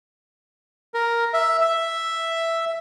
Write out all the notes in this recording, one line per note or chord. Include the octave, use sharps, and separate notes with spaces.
A#4
E5
E5